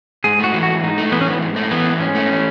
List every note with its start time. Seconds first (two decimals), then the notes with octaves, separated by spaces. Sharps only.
0.24 G#2 G#4
0.40 A3 F#4
0.54 E3
0.63 F#4
0.69 G#2
0.84 G#2 D#4
0.98 A3
1.12 E3 B3
1.21 C#4
1.27 G#2 B3
1.42 G#2
1.56 A3
1.71 E3 B3
1.86 G#2
2.00 G#2 C#4
2.15 A3
2.30 E3